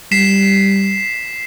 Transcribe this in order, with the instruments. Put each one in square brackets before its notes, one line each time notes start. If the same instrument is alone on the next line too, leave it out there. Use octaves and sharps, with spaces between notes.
[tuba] G3 [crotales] B6 C7 E7